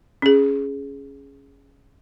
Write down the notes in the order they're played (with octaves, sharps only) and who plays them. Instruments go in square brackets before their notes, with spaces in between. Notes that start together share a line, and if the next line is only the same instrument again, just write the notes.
[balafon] C#4 G#4